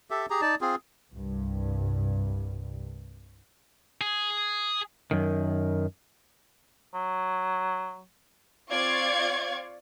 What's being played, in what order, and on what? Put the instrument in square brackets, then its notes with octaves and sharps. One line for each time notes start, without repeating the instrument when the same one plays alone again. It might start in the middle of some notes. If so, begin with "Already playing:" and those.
[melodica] G4 A4 E5
G4 G#4 A#5
D#4 D5 A5
C4 F4 G#4
[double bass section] C2 G2
[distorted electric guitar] G#4
[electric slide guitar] F#2 D#3
[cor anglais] F#3
[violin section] C4 F4 D5 F5 C#6 G#6